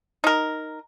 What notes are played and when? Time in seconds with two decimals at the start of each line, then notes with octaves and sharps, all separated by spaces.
0.24 D#4 A#4